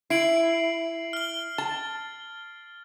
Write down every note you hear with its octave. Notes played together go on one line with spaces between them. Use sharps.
E4 C7 D7 F#7
F6 G7
A5 A6